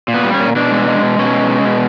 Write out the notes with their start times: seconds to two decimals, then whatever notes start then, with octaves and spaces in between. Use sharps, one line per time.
0.08 A#2
0.14 B3
0.23 G3
0.34 C#4
0.40 A#2
0.56 B2 D4
0.72 G#3
0.87 G#3
1.03 B2
1.19 B2 C#4
1.33 G#3
1.50 G#3
1.65 B2